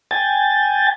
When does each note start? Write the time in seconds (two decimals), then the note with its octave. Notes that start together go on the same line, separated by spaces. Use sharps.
0.11 G5 G#5 A6